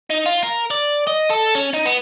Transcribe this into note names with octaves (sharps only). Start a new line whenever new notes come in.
D#4
F4
A#4
D5
D#5
A4
C#4
D#4
B3